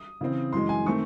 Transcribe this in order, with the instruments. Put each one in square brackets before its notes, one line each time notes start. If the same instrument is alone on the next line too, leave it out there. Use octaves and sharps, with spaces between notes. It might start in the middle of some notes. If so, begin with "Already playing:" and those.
Already playing: [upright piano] D#6
C#3 E3 C4
F#2 E3 G#3 C6
G#5
D#3 A3 C4 C#6